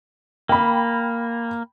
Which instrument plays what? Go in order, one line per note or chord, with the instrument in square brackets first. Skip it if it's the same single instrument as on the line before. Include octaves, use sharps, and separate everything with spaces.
[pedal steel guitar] A#3 [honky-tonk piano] G5 B5